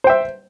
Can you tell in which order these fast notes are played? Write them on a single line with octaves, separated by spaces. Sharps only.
C5 G5 E5